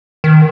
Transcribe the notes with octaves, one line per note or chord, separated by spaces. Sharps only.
D#3